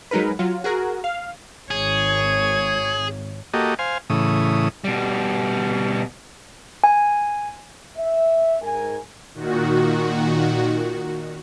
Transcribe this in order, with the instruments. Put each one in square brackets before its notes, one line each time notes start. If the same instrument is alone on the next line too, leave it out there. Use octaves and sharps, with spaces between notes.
[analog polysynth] F#3 G#3 D#4 A#4 B4
F#3 F4
F#4 G#4 A#4
F5
[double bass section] G#1 [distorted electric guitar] G#4 [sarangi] C#5
[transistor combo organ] A#3 F#4 G4 A4 D#5
C5 F5 G#5
A2 C#3 E3 D#6
[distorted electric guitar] B2 G3
[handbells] G#5
[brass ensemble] E5
G#2 A#4 G#5
[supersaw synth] A#2 D#3 F#4